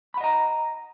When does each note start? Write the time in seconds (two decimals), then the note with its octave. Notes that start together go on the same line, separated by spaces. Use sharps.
0.14 B5
0.17 F#5
0.21 D#5
0.24 A#5